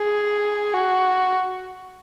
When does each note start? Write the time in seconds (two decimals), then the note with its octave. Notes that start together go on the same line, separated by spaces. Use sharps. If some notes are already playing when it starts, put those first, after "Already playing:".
Already playing: G#4
0.74 F#4